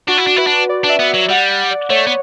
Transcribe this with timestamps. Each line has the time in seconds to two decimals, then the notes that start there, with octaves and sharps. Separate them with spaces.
0.08 D4 F#4
0.18 E4
0.27 D4
0.36 E4 B4
0.47 D4
0.69 D5
0.84 D4
0.89 E5
0.99 B3
1.10 F#3 E5
1.29 G3 F#5
1.50 F#5
1.70 D5
1.90 A3 C#5
2.07 B3